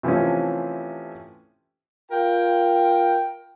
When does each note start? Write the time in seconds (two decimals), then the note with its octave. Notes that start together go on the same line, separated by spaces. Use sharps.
0.03 C3 E3 F3 A3 C#4
2.11 F4 A#4 G5